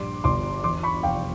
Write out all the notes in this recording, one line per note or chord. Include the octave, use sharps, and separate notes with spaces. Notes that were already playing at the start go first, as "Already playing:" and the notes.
Already playing: A#1 G2 C6 D6
G1 C6 D6
E2 C6 D6
B5 C#6
F1 F5 G5